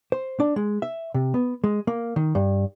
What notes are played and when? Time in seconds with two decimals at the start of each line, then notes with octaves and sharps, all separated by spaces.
0.12 C5
0.40 D4
0.56 G#3
0.82 E5
1.14 C3
1.34 B3
1.64 G#3
1.87 A#3
2.16 D#3
2.35 G2